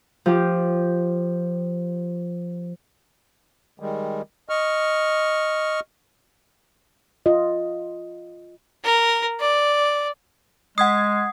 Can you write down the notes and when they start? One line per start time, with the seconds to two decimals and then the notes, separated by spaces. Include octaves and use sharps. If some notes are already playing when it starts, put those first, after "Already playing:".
0.26 F3 G4
3.80 D#3 G3 G#3
4.49 D#5 C#6 F6
7.26 F4 D#5
8.84 A#4
9.40 D5
10.78 G#3 F#5 D#6 G#6 C7